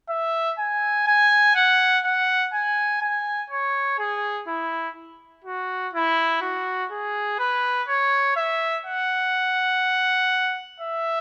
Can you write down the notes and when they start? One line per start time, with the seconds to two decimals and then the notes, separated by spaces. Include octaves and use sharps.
0.09 E5
0.59 G#5
1.07 G#5
1.55 F#5
2.04 F#5
2.54 G#5
3.01 G#5
3.50 C#5
3.99 G#4
4.48 E4
5.44 F#4
5.93 E4
6.42 F#4
6.91 G#4
7.39 B4
7.88 C#5
8.36 E5
8.86 F#5
10.80 E5